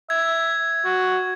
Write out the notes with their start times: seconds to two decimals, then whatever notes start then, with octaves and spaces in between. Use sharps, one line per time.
0.10 E5 G#6
0.85 F#4